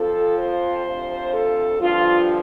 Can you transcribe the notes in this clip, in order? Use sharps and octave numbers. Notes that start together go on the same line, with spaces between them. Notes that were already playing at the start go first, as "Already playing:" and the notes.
Already playing: F2 F3 A4
C5
D2 C3 F3
A4
G2 D3 F3 F4